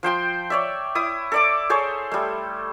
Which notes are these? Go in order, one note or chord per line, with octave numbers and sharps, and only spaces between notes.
F3 C5 G5 C6
C#5 D5 E5
E4 D#6
A4 D5 D6
G#4 A4 C5 C#5
G3 A3